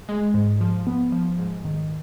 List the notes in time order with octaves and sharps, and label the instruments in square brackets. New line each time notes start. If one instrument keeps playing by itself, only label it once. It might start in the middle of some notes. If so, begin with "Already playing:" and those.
[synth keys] G#3
G#2
F3
B3
F3
G#2
D#3